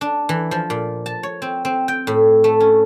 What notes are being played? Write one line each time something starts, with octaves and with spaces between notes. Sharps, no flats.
D4
E3
F3
A#2
A5
C#5
C4
C4
G5
A2
A3
C#4